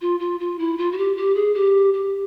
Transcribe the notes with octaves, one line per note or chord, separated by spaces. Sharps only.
F4
F4
F4
E4
F4
F#4
G4
G4
G#4
G4
G4